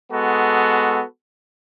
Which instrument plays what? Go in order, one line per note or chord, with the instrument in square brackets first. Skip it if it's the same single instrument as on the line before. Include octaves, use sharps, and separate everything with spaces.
[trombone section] G#3 B3 F#4 A4